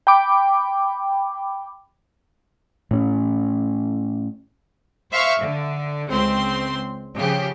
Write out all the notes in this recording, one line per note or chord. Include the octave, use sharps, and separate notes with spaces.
G5 B5 D6
A2 C#4
C5 E5 F5 C#6
D3
C#2 C4 C6
C#3 F3 G4